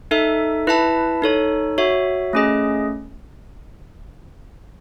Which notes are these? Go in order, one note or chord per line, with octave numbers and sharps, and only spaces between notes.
D#4 A4 E5
E4 B4 E5 A5
D#4 A4 C#5
F#4 C#5 E5
A3 C#4 G#4 D#5